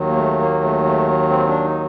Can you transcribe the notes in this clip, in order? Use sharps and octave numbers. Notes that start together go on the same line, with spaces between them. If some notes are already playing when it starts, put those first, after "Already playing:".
Already playing: D#2 D#3 F#3
A#3
A3
A#3
A3
A3
C4
D4
D#4